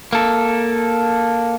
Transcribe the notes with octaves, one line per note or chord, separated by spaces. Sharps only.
A#3 A4